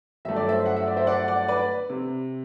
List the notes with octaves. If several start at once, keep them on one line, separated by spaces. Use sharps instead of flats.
G1 G2 F#3 A3 E5
D5
C5 E5
F#5
E5
D5
C5 E5
D5 F#5
D5 F#5
B4 D5
C3